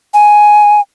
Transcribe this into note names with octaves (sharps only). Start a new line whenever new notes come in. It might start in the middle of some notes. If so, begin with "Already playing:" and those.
G#5